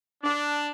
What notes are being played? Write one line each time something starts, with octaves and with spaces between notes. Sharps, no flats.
D4